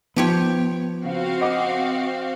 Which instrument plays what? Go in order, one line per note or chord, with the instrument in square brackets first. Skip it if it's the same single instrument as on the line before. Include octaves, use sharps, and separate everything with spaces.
[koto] F3 G4 C#5 [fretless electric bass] B3
[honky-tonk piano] C#3 [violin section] C4 F#4 F5
[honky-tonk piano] D#5 F#5 D6